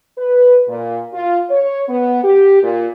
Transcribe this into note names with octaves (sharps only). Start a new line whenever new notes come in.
B4
A#2
F4
C#5
B3
G4
A#2